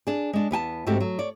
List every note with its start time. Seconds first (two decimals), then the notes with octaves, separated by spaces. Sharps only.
0.07 D4 G#4
0.33 G#3 D4
0.51 E2 B3 G#5 A5
0.87 G#2 A3 C4 F#4 G4
1.00 F#3
1.19 C#5 D5